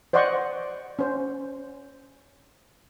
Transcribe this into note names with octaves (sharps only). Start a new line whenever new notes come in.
C5 D5 D#5 F#5 C6 C#6
C#4 C5